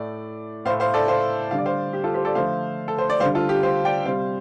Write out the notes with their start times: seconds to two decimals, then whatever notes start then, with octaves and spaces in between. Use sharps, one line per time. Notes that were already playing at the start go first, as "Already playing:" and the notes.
Already playing: A2 A3 D5
0.65 A2 C5 F5
0.69 A3
0.80 C5 F5
0.94 A4 D5
1.08 C5 F5
1.51 D3 G3 F5
1.58 D5
1.66 C5 F5
1.93 G4
2.04 F4 A4
2.14 G4 C5
2.25 A4 D5
2.35 D3 F3 A3 C5 F5
2.88 A4
2.98 C5
3.10 D5
3.20 D3 G3 C5 F5
3.35 F4 A4
3.49 G4
3.63 C5 F5
3.85 D5 G5
4.05 C3 G3 C5 F5